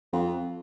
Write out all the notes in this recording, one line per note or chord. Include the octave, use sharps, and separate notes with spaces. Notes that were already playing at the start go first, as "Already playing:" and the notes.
F2